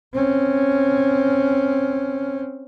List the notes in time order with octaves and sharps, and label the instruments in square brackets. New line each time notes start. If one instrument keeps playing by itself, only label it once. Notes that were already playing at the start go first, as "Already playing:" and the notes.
[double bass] C4 C#4